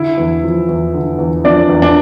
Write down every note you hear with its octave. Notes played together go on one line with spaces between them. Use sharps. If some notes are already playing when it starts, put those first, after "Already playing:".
Already playing: D3 E4
E2
F3
E2
D3
E2
F3 D4 D5
E2
D4 D5